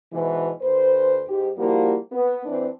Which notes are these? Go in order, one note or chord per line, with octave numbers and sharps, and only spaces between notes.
G#2 B2 E3
D2 B4 C5
G#2 G4
F3 G3 A#3 E4 F#4
B3
E3 C4 D4